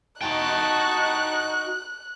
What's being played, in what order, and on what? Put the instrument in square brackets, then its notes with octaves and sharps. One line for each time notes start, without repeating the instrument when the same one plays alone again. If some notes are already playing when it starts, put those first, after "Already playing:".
[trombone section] D#4 [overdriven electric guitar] F#4 G5 [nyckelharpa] A5 C#6 [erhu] F#6